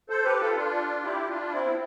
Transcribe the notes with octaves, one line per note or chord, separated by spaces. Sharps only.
A4 C5
G4 B4
F4 A4
D4 F4
E4 G4
D4 F4
C4 E4
B3